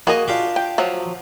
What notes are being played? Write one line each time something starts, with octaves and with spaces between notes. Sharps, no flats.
A#3 F#4 G#4 D#5
D4 F4 G4
G5
F3 F#3